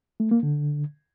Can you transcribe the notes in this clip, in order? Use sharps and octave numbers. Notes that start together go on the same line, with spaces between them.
A3
A#3
D3